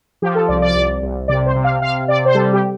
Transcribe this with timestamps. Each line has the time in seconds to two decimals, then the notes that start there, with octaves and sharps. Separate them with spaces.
0.22 F3 G4
0.35 A4
0.48 C2 D5
0.62 D5
0.75 C2
1.02 C2
1.28 C3 D5
1.46 C5
1.55 C3
1.64 F5
1.82 C3 F5
2.08 C3 D5
2.25 C5
2.35 G3 A4
2.53 G4